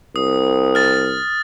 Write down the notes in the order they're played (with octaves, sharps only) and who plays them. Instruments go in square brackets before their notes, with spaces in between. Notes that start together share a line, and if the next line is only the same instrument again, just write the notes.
[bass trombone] C2 [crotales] D#6
[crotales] F6 A6